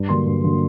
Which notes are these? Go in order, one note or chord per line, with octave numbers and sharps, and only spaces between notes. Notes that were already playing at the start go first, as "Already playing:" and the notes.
Already playing: G2
D3 F#3 A#3 C6
G2
D3 F#3 A#3